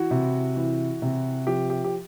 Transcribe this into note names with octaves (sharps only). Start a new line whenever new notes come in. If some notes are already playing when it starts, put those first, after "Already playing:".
Already playing: E3 F#4
C3
E3
C3
F3 G4
G4
G4